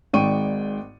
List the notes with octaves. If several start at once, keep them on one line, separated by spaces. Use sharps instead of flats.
G#1 G#2 D5 G5 C#6 D#7